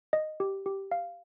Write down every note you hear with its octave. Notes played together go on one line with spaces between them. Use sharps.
D#5
G4
G4
F5